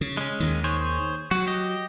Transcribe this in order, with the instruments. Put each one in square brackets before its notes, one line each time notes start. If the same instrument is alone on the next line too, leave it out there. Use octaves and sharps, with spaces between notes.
[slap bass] C#3
[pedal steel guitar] G#3 C#4
[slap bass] D#2 D#3
[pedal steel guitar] G#4 C5 C#5
[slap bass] F#3 [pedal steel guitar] F#4
[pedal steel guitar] G4 D#5